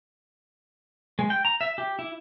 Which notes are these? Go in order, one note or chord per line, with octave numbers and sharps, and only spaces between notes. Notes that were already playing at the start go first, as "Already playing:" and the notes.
G#3
G5
A#5
E5
G4
E4